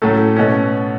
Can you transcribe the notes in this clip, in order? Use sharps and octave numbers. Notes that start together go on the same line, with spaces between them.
A2 F#3 A3 C#4 A4
B2 A3 C#4